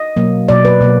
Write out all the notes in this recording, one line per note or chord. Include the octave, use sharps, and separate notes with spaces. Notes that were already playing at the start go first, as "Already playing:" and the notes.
Already playing: D#5
B2 F#3 A#3
B2 F#3 A#3 D5
B4
B2 F#3 A#3